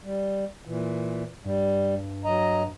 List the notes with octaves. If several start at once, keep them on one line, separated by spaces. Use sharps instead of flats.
G3
A#2 E3
G2 G3
F#3 D#5 A#5